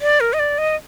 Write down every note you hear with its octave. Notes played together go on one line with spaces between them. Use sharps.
D5
A#4
D#5
D5
D#5